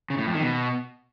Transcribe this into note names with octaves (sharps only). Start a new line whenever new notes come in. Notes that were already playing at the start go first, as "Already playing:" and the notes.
C#3
A2
F2
D#3
B2